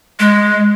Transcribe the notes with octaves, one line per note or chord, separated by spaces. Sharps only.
G#3